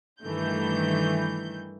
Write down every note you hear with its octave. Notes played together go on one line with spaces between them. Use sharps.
G2 D#3 E3 A3 G6